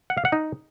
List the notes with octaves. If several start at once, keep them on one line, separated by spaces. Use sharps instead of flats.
F#5
F5
F#5
D#4